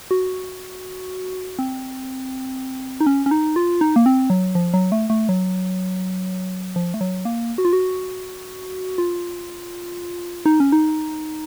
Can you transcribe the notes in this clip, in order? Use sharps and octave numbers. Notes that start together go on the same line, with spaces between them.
F#4
C4
D#4
C#4
C#4
D#4
F4
D#4
A#3
C4
F#3
F3
F#3
A3
A3
F#3
F3
A3
F#3
A#3
F#4
F4
F#4
F4
D#4
C#4
D#4